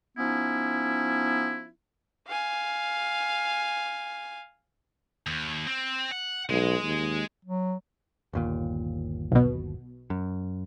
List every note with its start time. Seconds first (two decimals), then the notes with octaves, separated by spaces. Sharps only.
0.18 F3 B3 C#4 D#4 E4
2.28 F5 G#5
5.27 D#2
5.67 C4
6.11 F#5
6.50 B1 G#3
6.83 D#2
7.45 F#3
8.33 G1 D#2 A#2
9.31 B1 B2
10.10 F#2